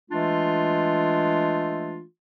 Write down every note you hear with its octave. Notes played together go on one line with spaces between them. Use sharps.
E3 G#3 A3 D4 F4